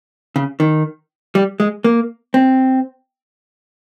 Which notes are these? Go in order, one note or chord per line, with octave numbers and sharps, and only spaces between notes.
C#3
D#3
G3
G#3
A#3
C4